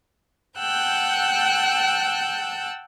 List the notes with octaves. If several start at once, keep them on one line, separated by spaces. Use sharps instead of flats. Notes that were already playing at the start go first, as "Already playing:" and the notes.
F#5 G5 A5 E6 F#6 G6